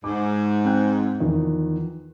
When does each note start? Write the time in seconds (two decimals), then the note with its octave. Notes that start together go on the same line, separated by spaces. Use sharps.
0.04 G#2 D6
0.65 C4 G5 F#6
1.20 E2 D#3 F3